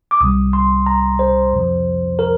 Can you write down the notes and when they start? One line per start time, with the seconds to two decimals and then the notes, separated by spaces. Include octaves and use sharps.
0.11 D6
0.21 C2 C3 G3 D#6
0.53 C6
0.86 A#5
1.19 C5
1.53 F2 C3 F3
2.19 A#4